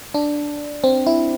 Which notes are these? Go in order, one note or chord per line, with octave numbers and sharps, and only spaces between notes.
D4
C4
E4